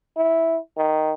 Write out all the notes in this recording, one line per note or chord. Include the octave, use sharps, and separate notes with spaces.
E4
D#3